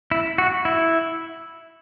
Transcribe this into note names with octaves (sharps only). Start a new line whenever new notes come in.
E4
F#4
E4